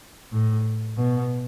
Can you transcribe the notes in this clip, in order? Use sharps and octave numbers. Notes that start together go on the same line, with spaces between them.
A2
B2